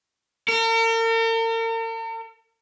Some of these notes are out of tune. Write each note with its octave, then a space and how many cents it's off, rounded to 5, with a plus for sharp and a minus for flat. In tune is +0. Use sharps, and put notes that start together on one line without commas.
A#4 -45